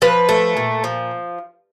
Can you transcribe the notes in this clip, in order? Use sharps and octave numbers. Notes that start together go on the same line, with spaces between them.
F3 B4
A3
A#2
F3